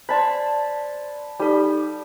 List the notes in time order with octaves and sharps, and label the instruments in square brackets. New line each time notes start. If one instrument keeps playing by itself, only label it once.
[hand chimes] C5 D5 C6 [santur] A5 B5
[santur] G3 [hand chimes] D#4 A4